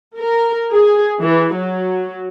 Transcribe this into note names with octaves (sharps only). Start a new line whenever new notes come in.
A#4
G#4
E3
F#3